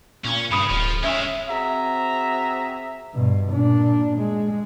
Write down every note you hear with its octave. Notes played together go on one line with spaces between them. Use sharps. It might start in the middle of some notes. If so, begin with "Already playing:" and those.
A#2 C#4
G2 C#3 B5 D#6
D1 F3
G#3 C#4 A#4 E5
C4 F#4 G#4 E5 A#5
G2 B2
A#2 D4
G#3